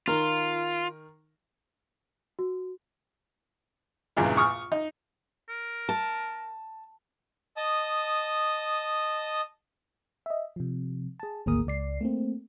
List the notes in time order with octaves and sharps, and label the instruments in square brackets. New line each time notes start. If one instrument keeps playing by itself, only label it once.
[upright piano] D#3 A#4 [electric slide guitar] F4
[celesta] F#4
[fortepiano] A#1 E2 G2 A#2 C#3 G#3
C#6 D#6 F6
D#4
[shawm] A#4
[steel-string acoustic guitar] A5
[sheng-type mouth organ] D#5 A5 D#6
[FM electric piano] D#5 E5
C3 F3
G#4 A5
G#1 D2 A#3 G#4 A#4 D#6
C#2 D5 C7
A3 A#3 C4